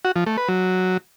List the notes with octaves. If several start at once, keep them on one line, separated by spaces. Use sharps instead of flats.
F#4
F3
A3
B4
F#3